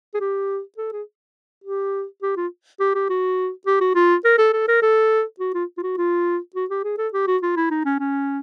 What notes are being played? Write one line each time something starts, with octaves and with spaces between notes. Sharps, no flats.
G#4
G4
A4
G#4
G4
G4
F4
G4
G4
F#4
G4
F#4
F4
A#4
A4
A4
A#4
A4
F#4
F4
F4
F#4
F4
F#4
G4
G#4
A4
G4
F#4
F4
E4
D#4
C#4
C#4